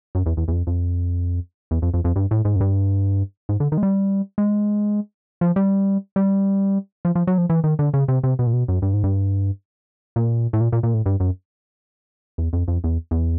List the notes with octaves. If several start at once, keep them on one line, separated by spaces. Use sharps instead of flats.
F#2
E2
E2
E2
F2
F2
E2
F2
F2
F2
G2
A2
G#2
F#2
G2
G#2
D3
D#3
G#3
G3
G#3
F3
G3
G3
F3
F3
F#3
F3
E3
D#3
D3
C#3
C3
C3
B2
A#2
B2
F#2
G2
G#2
G2
A#2
A2
A#2
A#2
A#2
A2
G2
F#2
E2
F2
F2
E2
E2